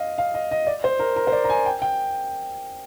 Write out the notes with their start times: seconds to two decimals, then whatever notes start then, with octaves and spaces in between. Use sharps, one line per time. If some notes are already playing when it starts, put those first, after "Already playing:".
Already playing: D#5 F5
0.18 F5
0.34 D#5
0.51 D#5
0.67 D5
0.84 C5
0.99 A#4
1.16 A#4
1.27 C5
1.32 D5
1.44 A#5
1.49 G#5
1.66 G5
1.82 G5